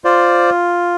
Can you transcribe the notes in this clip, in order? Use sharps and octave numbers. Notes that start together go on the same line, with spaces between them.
F4 C5 D5